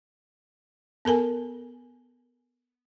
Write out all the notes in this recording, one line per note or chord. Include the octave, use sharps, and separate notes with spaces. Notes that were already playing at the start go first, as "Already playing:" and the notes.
B3 A4 A#4 G#5